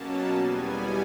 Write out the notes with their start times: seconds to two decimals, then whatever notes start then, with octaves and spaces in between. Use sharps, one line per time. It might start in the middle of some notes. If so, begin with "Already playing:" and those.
Already playing: B2 F#3 A#3 C#4 A5
0.28 E2 B2 G3 B3 G#5